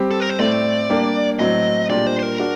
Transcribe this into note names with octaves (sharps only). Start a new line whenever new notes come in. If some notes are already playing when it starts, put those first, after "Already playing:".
Already playing: G3 C4 G4
A4
A#4
C5
A2 A3 C4 D5
G3 A#3 D4 G4
A2 F#3 C4 D#5
A#2 G3 D4 G4 D5
C5
C5
A#4
D4 F#4